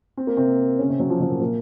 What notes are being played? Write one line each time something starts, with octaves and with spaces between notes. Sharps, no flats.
C4
A#3
C3 C4
C#3 C#4
C3 C4
F#3
F3
F#3
A#2 A#3
A#2 A#3